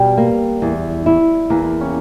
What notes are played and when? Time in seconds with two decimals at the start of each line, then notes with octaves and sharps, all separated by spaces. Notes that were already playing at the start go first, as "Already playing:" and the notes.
Already playing: B2 G3
0.17 A#3
0.62 E2
1.06 E4
1.50 E2 A#3
1.81 C#4